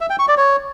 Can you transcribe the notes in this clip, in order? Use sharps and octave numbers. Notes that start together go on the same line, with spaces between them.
E5
G5
C#6
D5
C#5